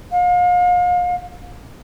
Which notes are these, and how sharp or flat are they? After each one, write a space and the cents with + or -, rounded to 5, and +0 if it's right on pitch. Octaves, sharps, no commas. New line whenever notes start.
F5 +35